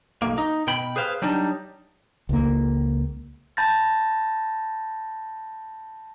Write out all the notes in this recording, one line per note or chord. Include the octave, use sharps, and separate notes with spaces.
B1 A#3
D#4
B2 G5 B5
G#4 B4 C5 F5
F#3 G3 D4 D#4
C#2 A#3
A5 B5 G6 A6 A#6